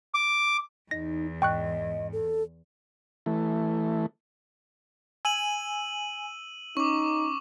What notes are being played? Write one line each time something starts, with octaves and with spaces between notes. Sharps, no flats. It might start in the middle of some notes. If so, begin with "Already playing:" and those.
D6
E2 D#4 A#6
G#2 D#5 G5 C#6 F#6
A4
E3 A3
G#5 E6 D#7 F#7
C#4 D#4 C#6 D6